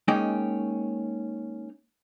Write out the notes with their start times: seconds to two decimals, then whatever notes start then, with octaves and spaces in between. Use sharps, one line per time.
0.08 G#3 A#3 C#4 D#4 G5